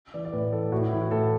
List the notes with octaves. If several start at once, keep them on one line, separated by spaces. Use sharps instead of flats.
E3 D5
D5
A2 B4
E3 A4
A2 F#4
E4
E3 E4
F#4
A2 A4